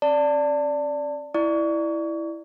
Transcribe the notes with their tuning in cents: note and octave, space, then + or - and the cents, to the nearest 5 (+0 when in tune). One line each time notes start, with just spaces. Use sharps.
C#4 -40 D5 -5 A5 +25
E4 +0 D5 +15 C#6 +30